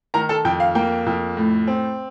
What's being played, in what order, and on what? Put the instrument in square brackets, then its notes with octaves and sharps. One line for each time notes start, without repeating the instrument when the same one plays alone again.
[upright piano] D#3 A#4 A#5
A4 A5
F2 G5
F5
A#3 G5
F2
A2
C4